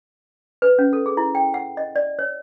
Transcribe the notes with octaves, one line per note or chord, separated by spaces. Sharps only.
B4
C#4
A4
G#4
E4
G5
F#5
D#5
D5
C#5